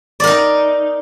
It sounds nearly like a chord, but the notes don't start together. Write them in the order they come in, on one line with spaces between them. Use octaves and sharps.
D5 A#4 D#4